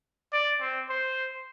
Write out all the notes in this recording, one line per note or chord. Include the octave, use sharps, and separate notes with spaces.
D5
C4
C5